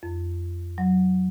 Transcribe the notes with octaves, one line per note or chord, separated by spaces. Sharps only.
F2
F#3